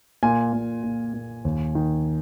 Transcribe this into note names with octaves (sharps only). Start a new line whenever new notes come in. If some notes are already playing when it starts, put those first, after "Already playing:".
A#2 G#5
A#2
A#2
A#2
D#2
D#3